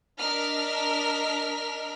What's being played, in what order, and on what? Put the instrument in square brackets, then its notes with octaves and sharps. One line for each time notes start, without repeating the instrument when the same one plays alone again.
[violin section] D4 A#4 D#5 F6 B6